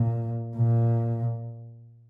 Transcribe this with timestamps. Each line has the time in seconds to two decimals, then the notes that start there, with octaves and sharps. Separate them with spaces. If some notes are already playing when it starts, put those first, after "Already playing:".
Already playing: A#2
0.57 A#2